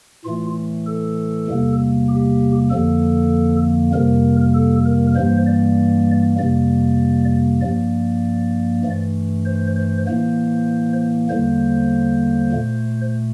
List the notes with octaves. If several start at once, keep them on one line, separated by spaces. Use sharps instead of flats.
A2 E3 A3 F4
A4
E2 C3 G3 A#3
G4
F2 D3 F3 A#3 A4
F2 C3 G3 A#3 A#4
A4
A#4
G2 E3 G3 A#3 C5
D5
F2 C3 G3 A#3 D5
G2 F3 A#3 D5
G2 E3 A3
C5
C5
A2 E3 A#3 C5
E2 D3 G3 A#3 C5
A#2 A3